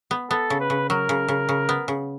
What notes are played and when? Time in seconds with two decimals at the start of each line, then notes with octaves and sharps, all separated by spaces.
0.11 B3
0.30 B3 A4
0.50 C#3
0.60 B4
0.70 C#3
0.90 F#3 A#4
1.09 C#3
1.28 C#3
1.49 C#3
1.69 B3
1.88 C#3